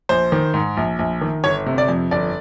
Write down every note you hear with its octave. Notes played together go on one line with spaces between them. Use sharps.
A#1 C5
D#3
G#2
A#1
A#1
D#3
G1 C#5
C3
D5
F2
G1 D5